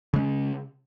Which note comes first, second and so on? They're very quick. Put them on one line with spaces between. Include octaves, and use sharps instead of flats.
C#3 G#3 C#4